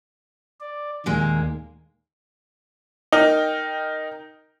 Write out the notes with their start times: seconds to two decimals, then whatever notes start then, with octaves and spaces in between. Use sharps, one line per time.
0.60 D5
1.06 D#2 A#2 D#3 G#3 A#3
3.12 D#4 A#4 G5